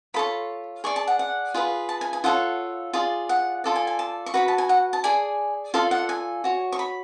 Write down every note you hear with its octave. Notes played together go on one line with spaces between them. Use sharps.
F4 A4 C#5 B5
G#4 D5 C#6
A5
F#5
F#5
F4 G#4 B4
A5
G#5
G#5
F4 A4 C#5 F#5
F4 G#4 D5
F#5
F4 A4 D5
G#5
G#5
A5
C#6
F#4 B4 D5 B5
A5
G#5
F#5
A5
G#4 D5 G#5
F4 A4 D5 F5
F#5
G#5
F#4 C#5
C#6
B5